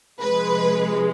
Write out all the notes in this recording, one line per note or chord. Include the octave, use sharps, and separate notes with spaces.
C3 F3 G#3 B4